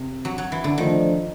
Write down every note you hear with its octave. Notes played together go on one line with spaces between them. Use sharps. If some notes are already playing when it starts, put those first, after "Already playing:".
Already playing: C3
F#3
F#3
E3
D3
D#3 F3 A3 D4